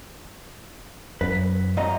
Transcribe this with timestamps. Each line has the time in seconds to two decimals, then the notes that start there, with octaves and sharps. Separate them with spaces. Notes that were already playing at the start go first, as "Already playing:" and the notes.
1.21 F#2 B4
1.77 F#2 D#5 A#5